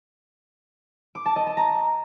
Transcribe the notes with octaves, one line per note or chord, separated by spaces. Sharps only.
D6
A5
D#5
A5
A#5